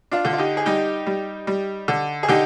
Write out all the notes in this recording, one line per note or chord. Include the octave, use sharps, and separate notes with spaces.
D4 F4
D3
F4
D#4 G4
G#4
G3 D#4 G4
G3
G3
D3
G#4
D3 D#4 G4